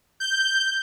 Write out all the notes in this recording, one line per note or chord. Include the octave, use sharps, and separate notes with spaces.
G6